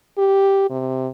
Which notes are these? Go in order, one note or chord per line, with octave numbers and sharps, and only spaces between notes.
G4
C3